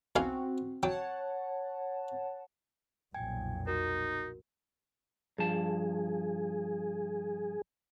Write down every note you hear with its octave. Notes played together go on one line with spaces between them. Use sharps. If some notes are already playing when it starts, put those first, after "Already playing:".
B1 C4 C#4 F#4 F5
F#3 C#5 F#5 G5 A5
B1 F2 A#2 G5 G#5 G#6
D#4 F#4 A#4
G2 F3 G#4 A5